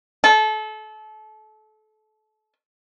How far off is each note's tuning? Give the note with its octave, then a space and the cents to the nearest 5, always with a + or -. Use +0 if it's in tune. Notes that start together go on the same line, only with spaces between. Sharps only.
A4 -30